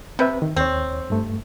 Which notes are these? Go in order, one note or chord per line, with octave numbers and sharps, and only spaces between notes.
C3 C4 B4 E5
D#3
D#2 C4 C#5
G2 A3